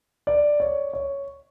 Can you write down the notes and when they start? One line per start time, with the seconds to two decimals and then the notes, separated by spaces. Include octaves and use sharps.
0.27 D5
0.60 C#5
0.93 C#5